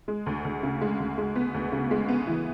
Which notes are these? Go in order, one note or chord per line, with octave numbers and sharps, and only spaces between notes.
G#3
D2
D2
C#3
G#3
D2
G#3
B3
D2
C#3
G#3
B3
E3